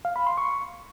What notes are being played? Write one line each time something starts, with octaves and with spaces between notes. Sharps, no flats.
F5
B5
C6
C#6